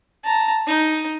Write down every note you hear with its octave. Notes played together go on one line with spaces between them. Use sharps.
A5 A#5
D#4